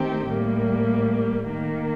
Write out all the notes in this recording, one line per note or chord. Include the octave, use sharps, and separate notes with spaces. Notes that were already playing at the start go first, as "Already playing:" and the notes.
Already playing: D#3 A3 C4 G4
A2 G3 A#3
D#3 A#3